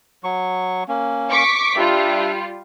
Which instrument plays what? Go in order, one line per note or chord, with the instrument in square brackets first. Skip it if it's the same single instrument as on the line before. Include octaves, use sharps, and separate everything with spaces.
[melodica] F#3 C#6
A#3 C#4
[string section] C#6 D6 B6
[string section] G3 F4 [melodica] D4 E5